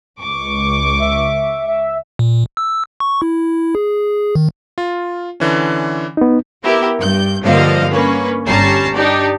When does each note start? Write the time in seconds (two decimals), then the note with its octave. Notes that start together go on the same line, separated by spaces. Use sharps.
0.20 C#2 C#6 D6
1.00 E5
1.68 E5
2.19 A#2
2.57 E6
3.00 C#6
3.22 E4
3.75 G#4
4.35 D#3
4.78 F4
5.40 D3 E3 C#4
6.17 B3 D#4
6.63 B3 E4 G4 A#4
6.98 G2 G6
7.42 G2 D3 F3 A#3 D#5 F5
7.91 A#3 C#4 B4
8.45 G1 G3 C#4 A5 A#5 C7
8.94 D4 D#4 G4 D5